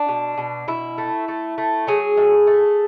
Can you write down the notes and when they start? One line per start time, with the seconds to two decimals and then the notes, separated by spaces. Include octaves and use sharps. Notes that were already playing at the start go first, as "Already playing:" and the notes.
Already playing: D4
0.08 B2
0.38 B2
0.68 B2 E4
0.98 A3
1.28 A3
1.58 A3
1.87 F#3 G#4
2.17 A2
2.47 A3